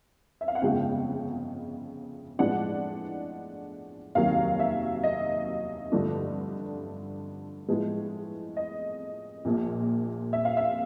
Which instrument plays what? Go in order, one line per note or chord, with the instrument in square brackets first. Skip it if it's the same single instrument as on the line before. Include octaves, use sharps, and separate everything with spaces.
[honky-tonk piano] E5
F5
F#5
G1 F2 C#3 F3 G#3 G5
A2 F3 G#3 B3 D4 F#5
F1 D#2 D#3 F#3 F5
E5
D#5
G2 D3 F3 A3 D4
A2 F3 G#3 B3
D#5
A#1 A#2 F3
E5
F5
E5